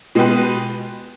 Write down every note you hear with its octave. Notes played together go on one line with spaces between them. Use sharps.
B2 G#3 B3 G4 B4